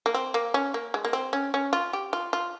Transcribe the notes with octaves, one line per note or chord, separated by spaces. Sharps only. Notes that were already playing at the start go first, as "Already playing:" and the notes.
A#3
C4
A#3
C#4
A#3
G#3
A#3
C4
C#4
C#4
F4
G4
F4
F4